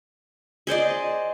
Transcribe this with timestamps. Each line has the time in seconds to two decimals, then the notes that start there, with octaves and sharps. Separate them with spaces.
0.67 G#4 C5 D5 D#5